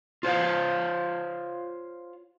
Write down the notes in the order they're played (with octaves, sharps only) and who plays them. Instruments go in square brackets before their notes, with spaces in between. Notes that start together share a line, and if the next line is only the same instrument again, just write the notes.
[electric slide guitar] F4 C5 C#5 F5